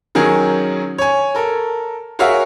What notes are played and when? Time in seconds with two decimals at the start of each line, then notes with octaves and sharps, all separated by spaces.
0.15 D#3 F#3 C#4 G#4 A#4
0.98 C#5 G#5
1.35 A4 A#4
2.19 F#4 G#4 A#4 C#5 E5 F5